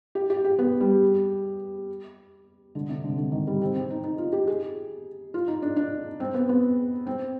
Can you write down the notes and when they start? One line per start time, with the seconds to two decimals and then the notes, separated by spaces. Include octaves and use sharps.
0.15 G4
0.30 G4
0.44 G4
0.59 B3
0.80 G3
2.75 D3
2.89 C3
3.04 D3
3.17 D3
3.32 D#3
3.47 G3
3.62 C4
3.75 C4
3.91 D#4
4.04 D#4
4.18 F4
4.32 G4
4.47 G#4
5.34 F4
5.48 D#4
5.62 D4
5.76 D4
6.20 C4
6.34 B3
6.49 B3
7.07 C4